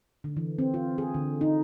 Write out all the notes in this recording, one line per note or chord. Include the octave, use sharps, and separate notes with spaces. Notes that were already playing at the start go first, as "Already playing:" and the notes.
D3
E3
C4
F4
G#4
D3
D#4